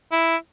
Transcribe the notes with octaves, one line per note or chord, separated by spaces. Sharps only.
E4